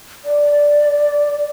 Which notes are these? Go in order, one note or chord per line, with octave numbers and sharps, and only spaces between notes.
D5